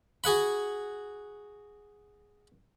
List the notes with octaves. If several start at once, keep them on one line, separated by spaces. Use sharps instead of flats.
F#4 G#4 F#5 B5